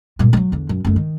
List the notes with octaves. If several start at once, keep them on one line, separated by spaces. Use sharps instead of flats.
G2 A#2
F#3 G#3
E2 D3
F#2
F#1 A3
D#3